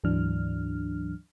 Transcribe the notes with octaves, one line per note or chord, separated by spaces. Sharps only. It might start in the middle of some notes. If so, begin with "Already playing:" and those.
D2 G#2 E3 F#3 D4 F6